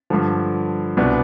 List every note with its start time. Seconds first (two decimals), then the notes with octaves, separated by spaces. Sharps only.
0.10 G2 D3 F3
0.97 C2 B2 B3 D4